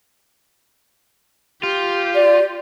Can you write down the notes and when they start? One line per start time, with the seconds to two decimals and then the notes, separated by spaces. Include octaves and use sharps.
1.63 F4 G4
2.15 D5